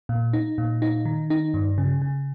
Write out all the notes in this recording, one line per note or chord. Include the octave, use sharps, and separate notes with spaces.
A#2
D#4
A#2
D#4
D#3
D#4
G2
C#3
C#3